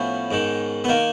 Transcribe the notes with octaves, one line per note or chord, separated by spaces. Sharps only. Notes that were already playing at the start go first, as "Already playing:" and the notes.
Already playing: A2 F3 B3 C#4
G#2 D#3
B3
D#3 A#3